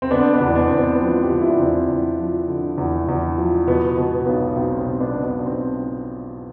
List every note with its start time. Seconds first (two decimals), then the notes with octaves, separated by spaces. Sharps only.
0.02 C4
0.11 D3 B3 D4
0.34 B3 D4
0.41 E2
0.55 B3 D4
0.68 E2 C4
0.78 B3
1.00 F3 C4
1.23 G4
1.30 D3 F4
1.42 E4
1.50 D4
1.59 E2 C4
1.89 E2
2.18 F3
2.48 D3
2.78 E2
3.08 E2
3.38 F3
3.67 B2 B3
3.97 B2 B3
4.26 B1 B3
4.55 B1 C4
4.79 C4
4.86 B2
5.00 B3 D4
5.15 B2
5.23 B3 D4
5.45 B1 C4